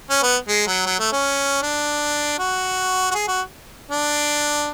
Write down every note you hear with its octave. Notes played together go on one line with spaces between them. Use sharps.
C#4
B3
G#3
F#3
F#3
A3
C#4
D4
F#4
F#4
G#4
F#4
D4